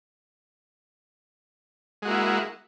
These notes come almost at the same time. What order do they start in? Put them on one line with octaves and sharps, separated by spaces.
G#3 F#4 A#3 E4